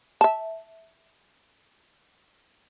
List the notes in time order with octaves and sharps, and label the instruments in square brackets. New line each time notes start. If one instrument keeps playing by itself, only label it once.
[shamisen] E5 A5